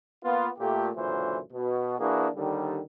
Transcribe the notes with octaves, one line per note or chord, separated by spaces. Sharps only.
A#3 B3 F4
A#2 A3 G4
C#2 F#2 A#2 D3 E3 C5
B2
E3 A#3 D4 E4 F#4 G#4
D#2 D3 D#3 G3